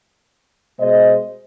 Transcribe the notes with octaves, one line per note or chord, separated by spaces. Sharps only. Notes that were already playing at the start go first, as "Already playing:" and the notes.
B2 G#3 C5 D#5